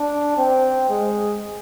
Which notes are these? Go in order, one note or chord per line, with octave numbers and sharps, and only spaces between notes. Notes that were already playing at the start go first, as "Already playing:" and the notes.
Already playing: D4
C4
G#3